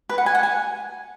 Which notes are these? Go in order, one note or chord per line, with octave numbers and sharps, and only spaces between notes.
B4
F#5
G#5
F#5
G#5